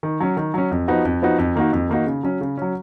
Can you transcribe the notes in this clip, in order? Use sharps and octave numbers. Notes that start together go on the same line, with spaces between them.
D#3
F#3 C#4
D#3
F#3 C#4
F2
F3 B3 D#4 F#4
F2
F3 B3 D#4 F#4
F2
D#3 A#3 D#4 F#4
F2
D#3 A#3 D#4 F#4
C#3
F#3 C#4
C#3
F#3 C#4